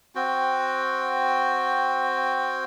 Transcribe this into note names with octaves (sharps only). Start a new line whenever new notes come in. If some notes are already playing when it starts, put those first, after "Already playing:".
C4 F#4 G5